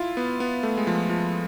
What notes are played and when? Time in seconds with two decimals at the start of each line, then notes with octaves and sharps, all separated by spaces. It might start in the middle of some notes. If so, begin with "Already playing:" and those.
Already playing: E4 F4
0.17 B3
0.40 B3
0.63 A3
0.77 G#3
0.87 F3
1.09 F3